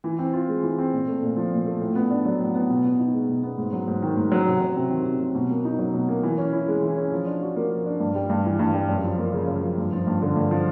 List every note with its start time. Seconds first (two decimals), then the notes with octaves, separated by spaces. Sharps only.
0.04 E3
0.19 C4
0.33 F4
0.48 G#3
0.63 E3
0.78 C4
0.93 A#2
1.07 A3
1.22 A#2
1.37 F3
1.52 A#2
1.66 A3
1.81 A2
1.95 B3
2.11 D4
2.25 F#3
2.40 A2
2.55 B3
2.70 B2
2.85 B3
2.99 D#4
3.13 G#3
3.29 B2
3.43 B3
3.58 G#2
3.73 F#3
3.88 G#2
4.02 D#3
4.17 G#2
4.32 F#3
4.46 C3
4.61 F#3
4.76 C3
4.91 D#3
5.06 C3
5.20 F#3
5.35 B2
5.50 A#3
5.65 D#4
5.79 F#3
5.94 B2
6.09 A#3
6.23 E3
6.38 C#4
6.53 E4
6.68 G#3
6.83 E3
6.97 C#4
7.12 F3
7.26 D4
7.42 F#4
7.56 A#3
7.70 F3
7.86 D4
8.00 G2
8.15 G3
8.30 G2
8.45 E3
8.59 G2
8.74 G3
8.89 F#2
9.04 F3
9.18 A#3
9.33 C#3
9.48 F#2
9.63 F3
9.77 G2
9.92 F3
10.07 G2
10.22 D3
10.36 G2
10.51 F3